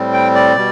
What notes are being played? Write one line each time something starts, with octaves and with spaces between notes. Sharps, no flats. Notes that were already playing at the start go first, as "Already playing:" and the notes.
Already playing: A2 G3 C4
G5
D5
B2 G3